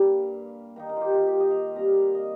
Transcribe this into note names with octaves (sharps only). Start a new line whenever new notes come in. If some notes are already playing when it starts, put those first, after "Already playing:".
Already playing: G2 G3 A#3 F5
D#3 A#3 D#4
A#4
F4 G4
F4
G4
D#5
F5
C3 G3 A#3 A#5
F5
D#5